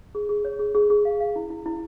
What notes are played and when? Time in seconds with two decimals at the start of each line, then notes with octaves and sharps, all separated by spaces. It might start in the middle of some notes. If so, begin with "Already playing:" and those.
0.15 G#4
0.29 G#4
0.45 C#5
0.59 G#4
0.75 G#4
0.90 G#4
1.05 F5
1.20 F5
1.36 E4
1.50 E4
1.66 E4